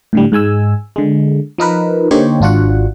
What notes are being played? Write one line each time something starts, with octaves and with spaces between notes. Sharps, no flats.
A2 D3 G3
G#2 G#3 G#5 E6
D3 G#3
F3 D#4 A#4 B4
D3 A#3 D#4 G4 C5 C#5
G#1 D4 F4 F#4 F#5